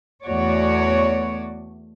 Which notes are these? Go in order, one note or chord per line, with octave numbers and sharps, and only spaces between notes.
E2 A3 F#4 C#5 D5